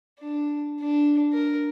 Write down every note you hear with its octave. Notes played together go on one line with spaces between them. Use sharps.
D4
D4
A#4